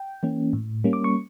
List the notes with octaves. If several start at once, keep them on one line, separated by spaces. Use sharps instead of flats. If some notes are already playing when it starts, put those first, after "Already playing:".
Already playing: G5
E3 A#3 C#4
A2
G3 A#3 C#4
D6
C#6